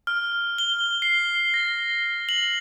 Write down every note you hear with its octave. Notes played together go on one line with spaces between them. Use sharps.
F6
G7
C7
A#6
F#7